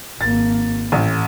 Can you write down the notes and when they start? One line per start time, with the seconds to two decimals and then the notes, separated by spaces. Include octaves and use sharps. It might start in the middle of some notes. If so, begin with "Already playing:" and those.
0.21 G#1 A#3 A6
0.92 A1 A2